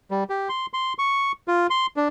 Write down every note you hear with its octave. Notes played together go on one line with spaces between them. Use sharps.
G3
G4
C6
C6
C#6
F4
C6
D4